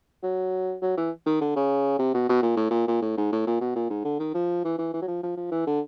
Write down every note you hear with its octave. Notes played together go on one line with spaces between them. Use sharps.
F#3
F#3
E3
D#3
D3
C#3
C3
B2
B2
A#2
A2
A#2
A#2
A2
G#2
A2
A#2
B2
A#2
G#2
D3
D#3
F3
E3
E3
E3
F#3
F3
F3
F3
E3
D3